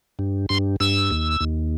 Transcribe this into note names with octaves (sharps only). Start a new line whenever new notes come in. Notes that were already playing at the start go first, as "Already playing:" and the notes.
G2
G2 C6
G2 E6
D#2
D#2